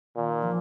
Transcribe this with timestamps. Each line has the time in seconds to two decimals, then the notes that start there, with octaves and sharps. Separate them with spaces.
0.16 A#2 D#3
0.43 F3